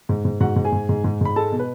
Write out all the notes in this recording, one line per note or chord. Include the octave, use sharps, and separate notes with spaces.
G#2
G#2
G#2 F#4 F#5
G#2
G#4 G#5
G#2
G#2
G#2
G#2 B5
G#3 A4 A5
B2
B4